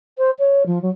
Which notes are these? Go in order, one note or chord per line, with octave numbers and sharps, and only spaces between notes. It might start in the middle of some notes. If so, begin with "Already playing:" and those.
C5
C#5
F3
F#3